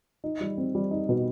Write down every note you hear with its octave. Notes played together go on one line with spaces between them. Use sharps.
D#4
G3
C4
G3
D#4
B2